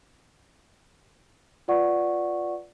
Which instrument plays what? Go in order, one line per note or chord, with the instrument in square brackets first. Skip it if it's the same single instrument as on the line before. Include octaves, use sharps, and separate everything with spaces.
[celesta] F4 B4 D5 F#5 C#6